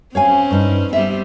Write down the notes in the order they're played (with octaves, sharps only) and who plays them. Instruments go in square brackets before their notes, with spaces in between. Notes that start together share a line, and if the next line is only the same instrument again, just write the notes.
[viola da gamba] C4 C#4 [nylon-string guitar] C#5 F5 G#5
[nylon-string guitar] G2 D#4
[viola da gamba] G3 B3 C4 [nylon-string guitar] E5